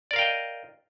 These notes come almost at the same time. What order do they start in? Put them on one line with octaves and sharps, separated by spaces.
D5 A#4 F5 G5 D#5